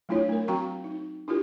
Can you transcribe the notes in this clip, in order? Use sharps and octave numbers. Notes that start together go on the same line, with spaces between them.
F#3 A3 D4 E4 F4 C#5
A3 A#4
F#3 C4 F#4 G5 A#5 C#6
D#4
D4 E4 F4 G4 A#4